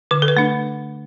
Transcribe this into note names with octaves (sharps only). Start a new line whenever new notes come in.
D3 B4
A4
B4
A3 D4